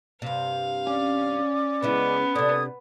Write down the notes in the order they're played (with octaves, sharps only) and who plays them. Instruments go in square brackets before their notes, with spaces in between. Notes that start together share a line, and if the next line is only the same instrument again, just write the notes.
[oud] G2 C3 [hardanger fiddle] F5
[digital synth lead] C#4 [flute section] D5 D6
[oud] C#3 G#3 E4 [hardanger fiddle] B3
[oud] C3 D4 [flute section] A4 D#6 G#6